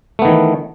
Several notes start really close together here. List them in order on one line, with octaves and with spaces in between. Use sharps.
A3 B3 D#3 E3